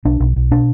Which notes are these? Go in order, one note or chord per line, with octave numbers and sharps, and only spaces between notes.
B1 D4
B1
B1
B2 D4